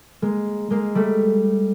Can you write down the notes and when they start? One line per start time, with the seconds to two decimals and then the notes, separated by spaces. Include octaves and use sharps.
0.22 G#3 A#3
0.70 G#3 A#3
0.95 G3 A3